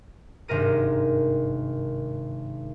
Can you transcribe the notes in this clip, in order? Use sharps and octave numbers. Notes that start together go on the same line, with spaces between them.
G#1 G2 C3 A#4 D#7